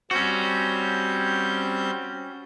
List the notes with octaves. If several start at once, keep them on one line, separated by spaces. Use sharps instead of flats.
G3 C4 C#4 F#4 G6